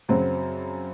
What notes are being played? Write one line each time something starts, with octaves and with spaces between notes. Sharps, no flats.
F#2 C#3 F#3 C4